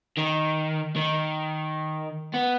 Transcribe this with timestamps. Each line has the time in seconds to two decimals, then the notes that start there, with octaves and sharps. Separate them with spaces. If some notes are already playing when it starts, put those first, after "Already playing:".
0.18 D#3
0.96 D#3
2.34 B3